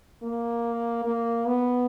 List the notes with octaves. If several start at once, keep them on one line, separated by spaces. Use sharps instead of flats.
A#3
A#3
B3